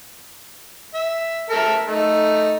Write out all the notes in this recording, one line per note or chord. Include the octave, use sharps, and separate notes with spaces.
E5
A4 A#4 E5
A3 D#4